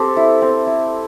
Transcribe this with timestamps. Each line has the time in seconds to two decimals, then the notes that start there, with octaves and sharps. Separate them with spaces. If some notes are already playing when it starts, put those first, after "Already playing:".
Already playing: C4 G4 A4
0.17 E4
0.42 C4
0.67 E4